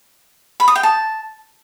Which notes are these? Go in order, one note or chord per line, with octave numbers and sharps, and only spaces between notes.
B5
D#6
G5
A5